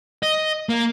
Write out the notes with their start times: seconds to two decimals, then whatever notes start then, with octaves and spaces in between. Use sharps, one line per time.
0.23 D#5
0.69 A#3